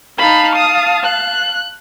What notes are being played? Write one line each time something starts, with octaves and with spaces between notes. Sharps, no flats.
D#4 F5 A5 B5
D#6
F#6